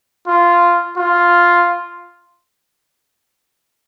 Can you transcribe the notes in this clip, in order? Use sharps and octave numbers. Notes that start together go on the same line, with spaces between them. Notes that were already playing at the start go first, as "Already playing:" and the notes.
F4
F4